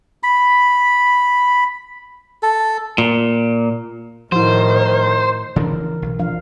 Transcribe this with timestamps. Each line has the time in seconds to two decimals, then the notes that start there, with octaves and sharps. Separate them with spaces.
0.23 B5
2.43 A4
2.98 A#2
4.32 A2 D#3 F3 E4 C5
5.56 C#3 E3 F3 D4 A#4
6.02 B1
6.19 F3 D4 F5